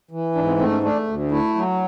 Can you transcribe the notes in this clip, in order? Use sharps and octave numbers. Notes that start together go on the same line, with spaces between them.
E3
G#2 D4
C4
A3 C4
C#4
A3 D4
D2
A3 E4
F#3